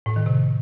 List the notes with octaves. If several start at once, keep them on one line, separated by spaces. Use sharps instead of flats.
A2
D#3
C3